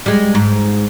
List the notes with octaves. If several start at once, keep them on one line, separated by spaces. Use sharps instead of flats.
G3 G#3
G#2